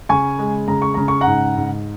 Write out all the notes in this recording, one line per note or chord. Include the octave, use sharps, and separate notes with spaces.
C#3 G#5 C#6
G#3
C#3 A#5
C#6
C#3 A#5
C#6
F#5 A#5
G#2
G#2